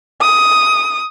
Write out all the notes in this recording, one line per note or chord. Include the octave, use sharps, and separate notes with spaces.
D#6